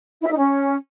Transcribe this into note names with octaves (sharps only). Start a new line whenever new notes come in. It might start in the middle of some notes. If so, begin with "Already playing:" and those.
E4
E5
D#4
C#4